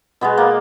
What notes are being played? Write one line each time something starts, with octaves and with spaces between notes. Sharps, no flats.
B2 G#3 B3
A#3